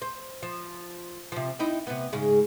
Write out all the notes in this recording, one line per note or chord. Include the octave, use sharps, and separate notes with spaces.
C5
F3
C3 F3
C4 D#4 E4
C3 B3
G#2 C#3 G#3